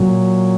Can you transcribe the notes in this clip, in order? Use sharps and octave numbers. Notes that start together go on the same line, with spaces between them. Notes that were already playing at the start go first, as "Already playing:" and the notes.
Already playing: A#2 F#3